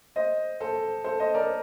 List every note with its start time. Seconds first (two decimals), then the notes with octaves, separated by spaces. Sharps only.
0.16 C5 D#5
0.60 A4 C5
1.04 A4 C5
1.19 C5 D#5
1.34 A#4 D5